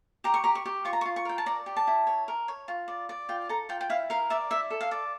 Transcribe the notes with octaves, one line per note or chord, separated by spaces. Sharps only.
G4 A#5
C#6
G4 A#5
C#6
G4
F4 C#6
A#5
C#6
F4
C#6
A#4 G5
A5
D5 A#5
G4
A5
E4
C#5
A#4
C#5
F4
D5
D5
F4 G5
A4 A#5
F4 G5
G5
E4 F5
A#4 F5
D5 E5
E4 E5
A4
F5
D5